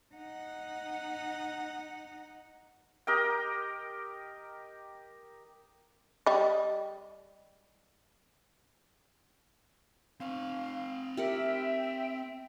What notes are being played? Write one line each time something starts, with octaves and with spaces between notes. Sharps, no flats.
D#4 F#5
G4 A#4 D#5 G5
G3 D#5
C4 F5 G#5
G4 A#4 E5 F#5 G5